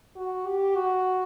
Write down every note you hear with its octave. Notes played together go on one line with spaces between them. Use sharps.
F#4
G4
F#4